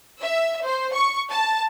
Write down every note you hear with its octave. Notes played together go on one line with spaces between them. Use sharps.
E5
C5
C#6
A5